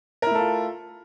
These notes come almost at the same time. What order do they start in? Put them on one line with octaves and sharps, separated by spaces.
A#4 E4 A3 A4 F4